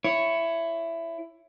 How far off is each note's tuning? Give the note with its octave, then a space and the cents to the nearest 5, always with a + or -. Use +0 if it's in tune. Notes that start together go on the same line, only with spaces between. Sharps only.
E4 +15 C#5 +0